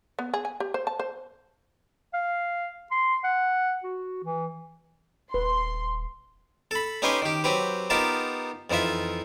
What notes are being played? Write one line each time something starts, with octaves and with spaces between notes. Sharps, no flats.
B3
G#4
G#5
G4
C5
A5
C5
F5
C6
F#5
F#4
E3
D#1 B4 C6
A4 B5
C#4 D#4 G4 B4 G#5 C6
D#3 G4
F#3 C4 G4 B4
B3 D#4 F4 G4 A#4 A5
F2 E3 D#4 F4 E5